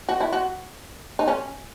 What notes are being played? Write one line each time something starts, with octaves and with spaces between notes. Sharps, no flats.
F#4
E4
F#4
D#4
C#4